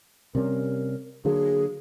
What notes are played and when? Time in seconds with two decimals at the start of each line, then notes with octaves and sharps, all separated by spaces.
0.35 C3 G3 C#4 A#4
1.25 D3 F#3 A#3 G#4